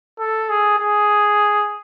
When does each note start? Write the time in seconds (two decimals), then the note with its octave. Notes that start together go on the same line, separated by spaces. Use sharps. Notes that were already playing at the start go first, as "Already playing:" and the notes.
0.19 A4
0.49 G#4
0.79 G#4